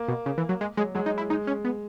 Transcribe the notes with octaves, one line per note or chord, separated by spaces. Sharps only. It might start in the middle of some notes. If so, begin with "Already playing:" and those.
Already playing: A#3
B2
C#3
E3
F#3
G#3
F#3 G#3
F#3 G#3
D#4
E4
G#3 D#4
C#4
B3